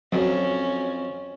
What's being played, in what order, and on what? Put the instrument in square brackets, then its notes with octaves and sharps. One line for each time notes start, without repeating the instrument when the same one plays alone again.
[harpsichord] F2 [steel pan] F#3 [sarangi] C#4